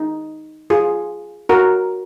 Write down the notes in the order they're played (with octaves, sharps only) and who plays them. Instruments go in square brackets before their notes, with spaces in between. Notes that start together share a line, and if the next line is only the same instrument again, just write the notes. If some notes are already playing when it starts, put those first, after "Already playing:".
Already playing: [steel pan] D#4
F4 G#4
F#4 A#4